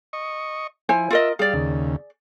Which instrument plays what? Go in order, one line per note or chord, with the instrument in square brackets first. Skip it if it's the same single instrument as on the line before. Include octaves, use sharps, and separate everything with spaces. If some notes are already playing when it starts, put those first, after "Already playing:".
[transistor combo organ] D#5 C#6
[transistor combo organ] F3 [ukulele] E4 C5 G#5
[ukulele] F4 A#4 D#5 [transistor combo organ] E5
[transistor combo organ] G3 F5 [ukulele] G#4 D5
[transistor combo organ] D#2 C#3